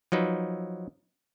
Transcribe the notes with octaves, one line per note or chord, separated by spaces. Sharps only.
F3 F#3 D#4 B4